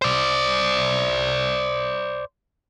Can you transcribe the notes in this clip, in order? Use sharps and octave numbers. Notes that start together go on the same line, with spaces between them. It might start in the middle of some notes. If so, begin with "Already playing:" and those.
C5 D5